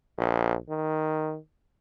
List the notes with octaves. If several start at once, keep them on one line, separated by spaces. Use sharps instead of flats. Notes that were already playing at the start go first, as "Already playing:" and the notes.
A#1
D#3